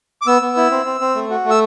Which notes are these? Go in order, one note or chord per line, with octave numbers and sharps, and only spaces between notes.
D6
B3 E6
B3
E4
C4
C4
C4
A3
F#4
A3
E6